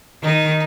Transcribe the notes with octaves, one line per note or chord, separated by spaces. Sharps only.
D#3 D#4